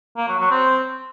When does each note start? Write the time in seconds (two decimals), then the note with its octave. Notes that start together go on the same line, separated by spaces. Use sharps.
0.17 A#3
0.28 F#3
0.39 F#3
0.51 C4